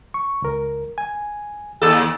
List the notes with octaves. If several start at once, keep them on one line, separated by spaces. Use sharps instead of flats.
C#6
C#2 A#4
G#5
D#2 A4